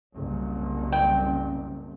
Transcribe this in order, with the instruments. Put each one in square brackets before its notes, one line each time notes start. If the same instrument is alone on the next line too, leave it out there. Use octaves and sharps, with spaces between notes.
[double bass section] F#1 C2
[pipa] G5